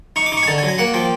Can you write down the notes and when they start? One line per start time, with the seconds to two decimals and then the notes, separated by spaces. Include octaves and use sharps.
0.16 D#4 C#6
0.26 D6
0.32 D#4 C#6
0.43 G#5
0.47 D3 A5
0.58 G#5
0.63 F#3
0.68 G#5
0.78 A#3 F#5
0.94 F3 G5